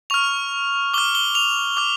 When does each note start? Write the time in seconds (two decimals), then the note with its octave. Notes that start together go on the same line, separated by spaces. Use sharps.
0.10 C#6 F6 F7
0.94 D6 G7
0.98 F6
1.15 G7
1.35 F7
1.77 D6 F6